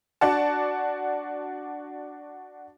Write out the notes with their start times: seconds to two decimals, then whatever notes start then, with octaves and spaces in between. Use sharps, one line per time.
0.21 D4 F#4 D5 F#5 A5